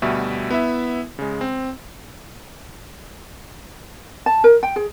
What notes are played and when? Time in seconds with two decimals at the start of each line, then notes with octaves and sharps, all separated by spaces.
0.02 D2 B2 G3 E5 C#6
0.51 B3 E4 E5
1.19 C#3 G#3
1.41 C4
4.26 A5
4.44 A#4
4.63 G5
4.76 G#4